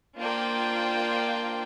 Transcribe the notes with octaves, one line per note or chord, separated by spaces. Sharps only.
A#3 D4 F4 C5 G5